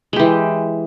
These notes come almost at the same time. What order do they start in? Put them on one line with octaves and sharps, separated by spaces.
G#3 G4 E3